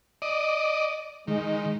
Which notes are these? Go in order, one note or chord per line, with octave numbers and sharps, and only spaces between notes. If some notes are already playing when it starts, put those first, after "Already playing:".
D5 D#5
D#3 G#3